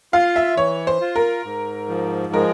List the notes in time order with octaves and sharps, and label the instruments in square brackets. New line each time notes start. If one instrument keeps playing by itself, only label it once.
[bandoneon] F4 [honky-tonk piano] F5
[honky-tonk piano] E5
[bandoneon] E3 [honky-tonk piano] C#5
[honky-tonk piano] C5
[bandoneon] F4
[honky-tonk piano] A#4
[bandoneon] G#2
F3
[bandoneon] G#3 [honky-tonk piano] A#4